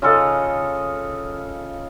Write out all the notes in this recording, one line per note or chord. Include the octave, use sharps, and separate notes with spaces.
C#3 F4 A4 D#5